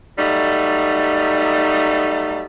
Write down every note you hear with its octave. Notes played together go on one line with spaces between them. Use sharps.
F#3 G3 A3 D#4